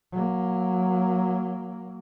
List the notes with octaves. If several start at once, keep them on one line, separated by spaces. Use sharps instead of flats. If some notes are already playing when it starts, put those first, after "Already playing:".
F#3 A#3